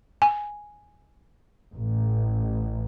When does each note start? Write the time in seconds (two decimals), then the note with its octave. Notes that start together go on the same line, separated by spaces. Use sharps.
0.22 G#5
1.74 A1